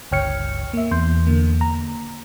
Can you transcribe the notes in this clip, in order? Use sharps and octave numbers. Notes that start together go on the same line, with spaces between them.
G1 C#2 C#5 G5 F6 C#7
A#3 E5
E2 C6 G6
D3 A#3
A#5